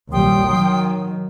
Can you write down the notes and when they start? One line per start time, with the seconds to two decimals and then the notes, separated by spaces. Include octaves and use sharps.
0.12 A#1 D#2 G3 G5 C6 D#6
0.43 D#3 F#3